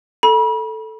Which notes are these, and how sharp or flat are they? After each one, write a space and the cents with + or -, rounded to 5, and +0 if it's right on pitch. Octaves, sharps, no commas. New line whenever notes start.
A4 +0 B5 -40